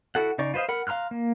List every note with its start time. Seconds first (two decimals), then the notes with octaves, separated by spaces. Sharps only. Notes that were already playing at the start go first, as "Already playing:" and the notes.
0.15 E4 F#4 A4 F#5
0.38 C#3 D#4 D5 C#6
0.54 F4 B4 C5 D#5 F5
0.69 A#4 F#5 B5
0.87 F5 A#5 C6 F6 F#6
1.11 A#3